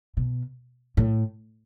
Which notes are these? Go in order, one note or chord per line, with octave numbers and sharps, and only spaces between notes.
B2
A2